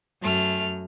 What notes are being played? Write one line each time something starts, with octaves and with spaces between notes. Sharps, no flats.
F#2 A3 F6